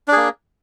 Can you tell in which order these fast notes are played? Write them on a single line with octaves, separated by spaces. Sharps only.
D4 G#4 A#3